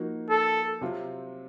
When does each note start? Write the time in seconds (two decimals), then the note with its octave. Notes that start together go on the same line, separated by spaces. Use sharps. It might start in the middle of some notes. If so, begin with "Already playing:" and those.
Already playing: F3 A#3 D#4 F#4
0.30 A4
0.81 C3 F#3 C4 F4